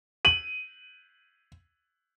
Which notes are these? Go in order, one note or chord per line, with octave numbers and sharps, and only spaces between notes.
D#7 F#7